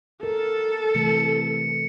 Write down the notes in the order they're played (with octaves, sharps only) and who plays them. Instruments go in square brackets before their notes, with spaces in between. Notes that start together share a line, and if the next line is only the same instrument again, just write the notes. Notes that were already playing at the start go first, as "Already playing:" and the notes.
[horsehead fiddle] A4 [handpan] A#4
[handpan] C3 E3 A3 [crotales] C#7